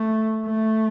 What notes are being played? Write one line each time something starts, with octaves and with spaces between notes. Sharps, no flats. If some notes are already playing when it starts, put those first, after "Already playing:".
Already playing: A3
A3